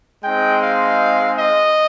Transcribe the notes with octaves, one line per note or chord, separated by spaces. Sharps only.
G#3 C4 D#4 G5
F5
D#5